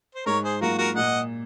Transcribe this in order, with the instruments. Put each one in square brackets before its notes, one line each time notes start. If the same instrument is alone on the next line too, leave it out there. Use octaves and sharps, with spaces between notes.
[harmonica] C5
[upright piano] G#2 [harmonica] A#4 C#5
[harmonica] G#4 C5
[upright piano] F#3 A#3 F4 [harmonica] F#4 A#4
[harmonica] F#4 A#4
[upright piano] A#2 [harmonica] D#5 F#5